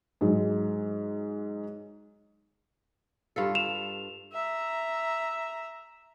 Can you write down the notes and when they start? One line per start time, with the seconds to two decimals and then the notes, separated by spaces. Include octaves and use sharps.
0.21 G#2 F#3 G#3
3.36 G2 F4 A4
3.55 E7 F7
4.32 E5 A#5